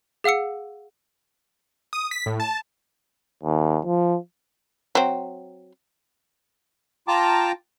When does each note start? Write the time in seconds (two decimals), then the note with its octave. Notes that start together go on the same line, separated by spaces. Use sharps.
0.24 G#4 F5 F#5 E6 C#7
1.93 D#6
2.11 B6
2.26 A2
2.40 A5
3.43 D#2
3.85 F3
4.95 F#3 C4
7.08 F4 G5 A5 A#5 D6